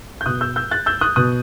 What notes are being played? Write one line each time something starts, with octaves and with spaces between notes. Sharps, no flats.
G6
B2 D#6 F#6
E6 G6
E6 G6
F#6 A6
E6 G6
D#6 F#6
B2 D#6 F#6